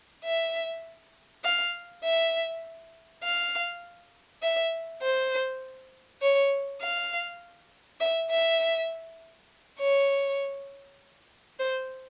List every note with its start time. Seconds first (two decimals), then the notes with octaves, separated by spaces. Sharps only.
0.24 E5
1.44 F5
2.04 E5
3.23 F5
4.42 E5
5.02 C5
6.22 C#5
6.82 F5
8.01 E5
8.30 E5
9.80 C#5
11.59 C5